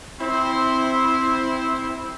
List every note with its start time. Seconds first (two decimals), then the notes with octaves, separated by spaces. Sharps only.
0.20 C4 E4 C5